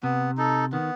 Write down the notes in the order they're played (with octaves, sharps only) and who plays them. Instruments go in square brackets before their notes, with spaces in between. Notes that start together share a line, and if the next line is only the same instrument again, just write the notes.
[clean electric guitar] C3 [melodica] B3
[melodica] D#4 A4
[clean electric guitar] D#3 [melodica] B3